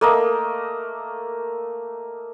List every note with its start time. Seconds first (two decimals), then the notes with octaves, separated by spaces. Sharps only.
0.01 A3 A#3 D#5